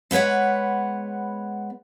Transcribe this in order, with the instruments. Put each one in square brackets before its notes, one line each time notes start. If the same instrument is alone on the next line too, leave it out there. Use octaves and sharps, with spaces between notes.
[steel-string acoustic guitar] G#3 B3 B4 C#5 F#5